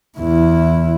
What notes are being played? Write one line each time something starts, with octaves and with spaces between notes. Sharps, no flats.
E2 E4